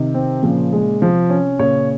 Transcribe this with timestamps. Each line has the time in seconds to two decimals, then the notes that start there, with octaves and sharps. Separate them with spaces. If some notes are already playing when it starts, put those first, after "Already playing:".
Already playing: C3 D#3
0.14 C4
0.42 A#2 C#3 F3
0.73 G#3
1.02 C3 F3
1.30 C#4
1.59 A#2 C#3 C#5